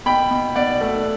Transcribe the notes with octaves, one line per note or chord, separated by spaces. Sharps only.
B2 G5 B5
B2
B2 D5 F#5
A3